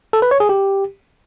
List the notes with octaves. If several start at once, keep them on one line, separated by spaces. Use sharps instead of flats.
A4
B4
C#5
G#4
G4